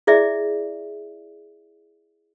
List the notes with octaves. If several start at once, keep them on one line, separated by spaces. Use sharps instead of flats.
E4 G#4 D5 E5